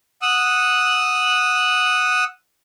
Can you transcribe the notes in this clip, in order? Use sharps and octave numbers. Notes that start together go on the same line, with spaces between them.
F#5 D#6 E6 F#6